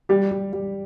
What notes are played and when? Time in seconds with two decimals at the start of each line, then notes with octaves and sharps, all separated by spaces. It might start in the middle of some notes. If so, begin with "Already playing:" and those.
0.09 G3 G4
0.31 G3
0.53 G3